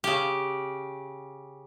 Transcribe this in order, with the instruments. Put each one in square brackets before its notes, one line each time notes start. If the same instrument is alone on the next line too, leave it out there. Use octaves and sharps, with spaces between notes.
[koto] C#3 G4